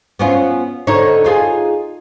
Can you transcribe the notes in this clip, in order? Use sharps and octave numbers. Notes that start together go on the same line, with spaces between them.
B3 C#4 F4
D3 D#4 C#5
D#4 F4 G#4